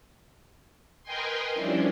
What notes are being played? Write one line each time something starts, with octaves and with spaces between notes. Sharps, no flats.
A#4 B4 D#5 G5 G#5 C6
F3 G3 C#4 D4 E4